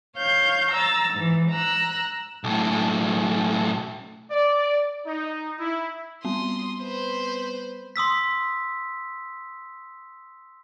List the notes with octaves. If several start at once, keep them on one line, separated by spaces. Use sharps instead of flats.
C#5 F5 G6
A#5 E6 A6
G#2 E3
A#5 E6 F#6
B1 A2
D5
D#4
E4
G3 B3 C4 C6 D#6
B4 C5
C6 D#6 E6 B6